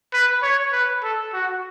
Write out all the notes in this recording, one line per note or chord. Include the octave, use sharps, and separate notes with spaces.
B4
C#5
B4
A4
F#4